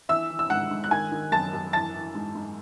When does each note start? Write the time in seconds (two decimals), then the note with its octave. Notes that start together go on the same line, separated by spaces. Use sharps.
0.09 E3 E5 E6
0.30 E3
0.39 E6
0.50 G#2 F#5 F#6
0.71 G#2
0.84 F#6
0.91 D#3 G#5 G#6
1.12 D#3
1.32 F#2 A5 A6
1.53 F#2
1.73 E3 A5 A6
1.94 E3
2.15 G#2
2.35 G#2